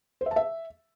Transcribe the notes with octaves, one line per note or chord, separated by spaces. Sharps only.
C5
E5
A5
E5